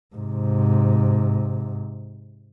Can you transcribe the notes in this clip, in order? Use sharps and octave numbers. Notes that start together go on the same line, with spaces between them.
G#2 C3